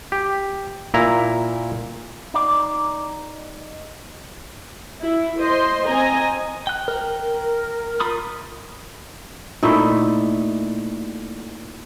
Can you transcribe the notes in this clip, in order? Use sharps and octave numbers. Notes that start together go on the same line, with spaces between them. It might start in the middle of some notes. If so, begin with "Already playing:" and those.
G4
A#2 E4 A#5
D#4 D5
E4
C5 D#5 C6
C4 D#5 G#5 A#5
G5 F#6
A#4
F4 B5 D#6
A#2 A3 D#4 E4